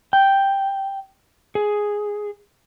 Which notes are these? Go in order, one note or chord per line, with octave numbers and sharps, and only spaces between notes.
G5
G#4